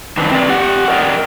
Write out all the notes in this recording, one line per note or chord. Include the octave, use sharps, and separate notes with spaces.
D#3 E3 C4 D4 B4
C4 D5
G4 F#5
A#4 D5 D#5 G5